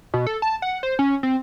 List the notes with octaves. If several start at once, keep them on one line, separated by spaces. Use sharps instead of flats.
B2
A4
A5
F#5
C5
C#4
C4